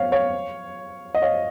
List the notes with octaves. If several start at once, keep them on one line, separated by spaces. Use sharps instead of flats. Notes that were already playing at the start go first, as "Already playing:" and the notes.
Already playing: C#5 F5
C#5 F5
D#5
C#5 F5